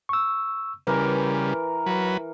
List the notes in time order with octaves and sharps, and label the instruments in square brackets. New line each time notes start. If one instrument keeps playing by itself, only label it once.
[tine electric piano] C#6 E6
[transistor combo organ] C#3 G3 [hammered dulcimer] E3 A#4 [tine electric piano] B4
[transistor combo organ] F#3 B4